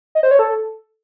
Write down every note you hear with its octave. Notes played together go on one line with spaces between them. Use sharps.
D#5
C5
C#5
A4